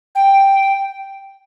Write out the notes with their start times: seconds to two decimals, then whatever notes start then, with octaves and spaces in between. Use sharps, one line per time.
0.15 G5